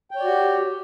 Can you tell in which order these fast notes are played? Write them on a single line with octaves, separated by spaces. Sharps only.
G5 C#5 D5 F#4 G4